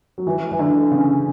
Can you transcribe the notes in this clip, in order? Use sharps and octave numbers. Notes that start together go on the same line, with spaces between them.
F#3
E3
E3
D3
C#3